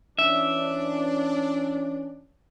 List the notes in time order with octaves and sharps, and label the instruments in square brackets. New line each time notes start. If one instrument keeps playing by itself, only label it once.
[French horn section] E3 C#4 [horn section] D4 [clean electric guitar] E5